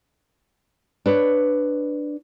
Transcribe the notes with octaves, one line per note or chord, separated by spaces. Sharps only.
D4 B4 C#5